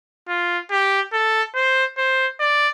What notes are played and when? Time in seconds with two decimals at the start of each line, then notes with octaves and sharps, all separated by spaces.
0.29 F4
0.71 G4
1.13 A4
1.55 C5
1.98 C5
2.40 D5